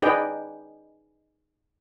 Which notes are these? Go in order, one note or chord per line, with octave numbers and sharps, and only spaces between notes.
D#4 G#4 B4 D5 D#5 G5